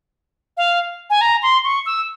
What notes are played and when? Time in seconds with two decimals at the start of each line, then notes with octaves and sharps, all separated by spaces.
0.57 F5
1.10 G#5
1.21 A#5
1.43 C6
1.64 C#6
1.86 E6